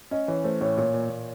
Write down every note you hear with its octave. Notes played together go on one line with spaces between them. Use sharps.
C#4 D#5
E3 C#5
A3 C5
A2 C#5
A#2 C#5
A#2
A#2